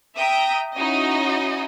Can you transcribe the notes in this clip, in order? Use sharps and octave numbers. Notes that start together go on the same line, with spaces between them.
E5 G5 A#5 D#6
C#4 D#4 E4 F#4 D#5